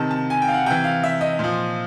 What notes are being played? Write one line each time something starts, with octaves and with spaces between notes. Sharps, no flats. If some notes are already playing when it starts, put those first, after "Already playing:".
Already playing: C3 D#3 A5
A5
G#5
G5
F5
F#5
C3 E3 G5
F5
E5
D#5
A#2 F3